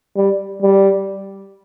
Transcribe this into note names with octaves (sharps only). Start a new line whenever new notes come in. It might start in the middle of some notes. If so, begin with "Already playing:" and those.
G3
G3